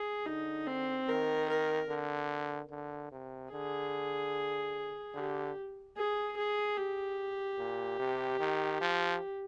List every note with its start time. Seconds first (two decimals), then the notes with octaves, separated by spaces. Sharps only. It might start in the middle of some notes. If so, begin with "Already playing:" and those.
Already playing: G#4
0.26 D3 D#4
0.67 C4
1.08 D#3 A#4
1.49 A#4
1.89 D3
2.71 D3
3.12 C3
3.52 D3 G#4
5.15 D3 G4
5.97 G#4
6.36 G#4
6.77 G4
7.59 A#2
8.00 C3
8.40 D#3
8.81 F3